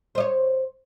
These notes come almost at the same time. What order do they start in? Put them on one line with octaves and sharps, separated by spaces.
C5 D#5 C#5